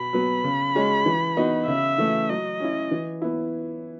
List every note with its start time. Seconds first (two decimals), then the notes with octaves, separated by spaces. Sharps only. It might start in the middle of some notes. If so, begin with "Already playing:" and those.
Already playing: B2 B5
0.13 F#3 B3
0.44 C#3
0.75 G#3 C#4
1.06 E3
1.37 B3 D#4 F#4
1.67 C#3 E5
1.98 E3 A3
2.29 F#3 D#5
2.60 C#4 E4
2.91 E3
3.22 B3 E4